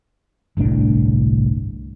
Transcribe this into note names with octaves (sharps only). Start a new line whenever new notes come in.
G1 C2 A2 D4